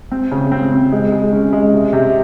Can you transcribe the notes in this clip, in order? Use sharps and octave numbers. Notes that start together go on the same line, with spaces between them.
C4
C#3
C4
C4
G#3
G#3
C#4
G#3
C3
C3